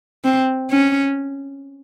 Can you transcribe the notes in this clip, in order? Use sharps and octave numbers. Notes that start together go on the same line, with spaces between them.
C4
C#4